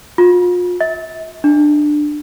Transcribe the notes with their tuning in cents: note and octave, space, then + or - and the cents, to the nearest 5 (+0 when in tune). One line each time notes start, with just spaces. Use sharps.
F4 +35
E5 -40
D4 +15